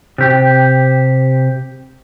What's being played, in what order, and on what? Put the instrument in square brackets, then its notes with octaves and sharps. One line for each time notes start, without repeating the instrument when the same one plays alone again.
[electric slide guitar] C3 G4